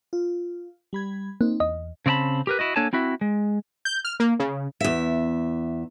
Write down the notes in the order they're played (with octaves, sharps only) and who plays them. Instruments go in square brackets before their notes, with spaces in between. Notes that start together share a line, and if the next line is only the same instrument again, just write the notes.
[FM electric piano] F4
G3 B5 G#6
[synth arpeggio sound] A#3 [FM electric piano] C4 D#4
[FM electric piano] E2 [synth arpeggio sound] D#5
[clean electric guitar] C#3 C4 D5 A5 B5
G4 A#4 B4
E4 F#4 D#5
A#3 D4 A4 C#5 G#5 A5
C4 E4 F#4 E5
G#3
[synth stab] G6
F6
A#3
C#3
[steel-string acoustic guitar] E2 E5